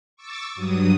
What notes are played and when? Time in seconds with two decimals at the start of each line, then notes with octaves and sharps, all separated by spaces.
0.16 C#6 D6 E6 A6
0.55 G2 F#3 D#6